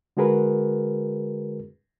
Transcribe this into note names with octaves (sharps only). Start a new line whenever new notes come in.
D3 G#3 F#4 G#4 A#4 B4